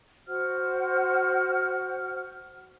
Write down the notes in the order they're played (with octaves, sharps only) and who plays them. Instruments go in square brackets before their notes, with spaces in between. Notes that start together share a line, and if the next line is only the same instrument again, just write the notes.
[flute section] F#4 C5 F#5 F6